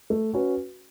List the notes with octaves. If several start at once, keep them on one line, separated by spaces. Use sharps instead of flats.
A3
C#4 F#4 B4